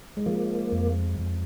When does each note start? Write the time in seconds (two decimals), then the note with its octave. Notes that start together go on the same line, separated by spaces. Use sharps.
0.17 G#3
0.26 F3 A#3
0.72 F2
1.19 F2